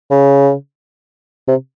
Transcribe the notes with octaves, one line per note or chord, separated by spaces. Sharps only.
C#3
C3